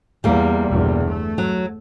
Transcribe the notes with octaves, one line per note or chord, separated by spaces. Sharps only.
E2 G3 A#3
G1 E2 B2
A3
F#3